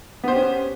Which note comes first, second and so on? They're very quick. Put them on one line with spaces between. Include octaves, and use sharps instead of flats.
B3 C5 G4 C#4